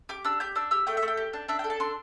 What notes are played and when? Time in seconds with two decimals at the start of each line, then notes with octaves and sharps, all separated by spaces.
0.09 G4 D6
0.25 D4 E6
0.40 G4 G6
0.55 D4 E6
0.71 G4 E6
0.87 A3 G5
0.97 E5
1.02 A3
1.08 G5
1.17 G4
1.33 D4
1.48 D4 E5
1.59 G5
1.64 A4
1.70 A5
1.80 D4 C6